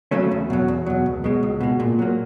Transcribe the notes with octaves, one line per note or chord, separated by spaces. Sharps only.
C#3 F#3 A3 C#4
E2
B2 F#3
E2
B2 F#3
C#2
B2 G#3
C#2
B2 G#3
A#2
F#3 A#3